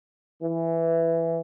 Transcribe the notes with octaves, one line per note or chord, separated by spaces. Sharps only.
E3